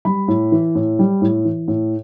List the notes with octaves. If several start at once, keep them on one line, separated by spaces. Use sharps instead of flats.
G3 B5
A2
E3
A2
G3
A2
E3
A2